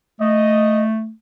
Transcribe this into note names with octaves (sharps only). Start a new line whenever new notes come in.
A3 D#5